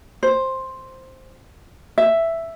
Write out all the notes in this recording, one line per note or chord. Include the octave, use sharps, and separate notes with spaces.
C5
E5